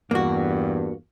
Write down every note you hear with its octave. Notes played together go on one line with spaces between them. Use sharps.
E2 G2 A#3 F#4